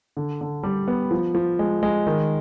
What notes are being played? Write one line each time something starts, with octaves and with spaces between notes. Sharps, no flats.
D3
D3
G3
B3
F3
F3
G#3
G#3
D#3